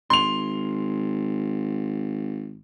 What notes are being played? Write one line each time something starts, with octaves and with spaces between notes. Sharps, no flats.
G#1 C6 F7